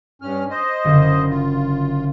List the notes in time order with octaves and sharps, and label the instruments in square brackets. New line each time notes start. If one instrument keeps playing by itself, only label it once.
[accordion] G2 C#4 F6
C5 D#5
[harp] F#1 D3
[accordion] F4